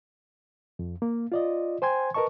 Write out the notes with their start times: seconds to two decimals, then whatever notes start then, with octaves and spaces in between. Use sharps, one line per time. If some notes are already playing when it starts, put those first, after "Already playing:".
0.79 F2
1.02 A#3
1.32 F4 D5 D#5
1.82 C5 G5 G#5 C6 G#6
2.14 A#4 B4 D#5 A5 C#6